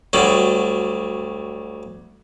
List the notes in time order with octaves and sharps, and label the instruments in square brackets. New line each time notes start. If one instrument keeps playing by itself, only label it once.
[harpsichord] D2 F#3 G3